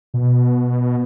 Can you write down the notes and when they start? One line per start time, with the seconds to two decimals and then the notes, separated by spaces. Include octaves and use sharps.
0.14 B2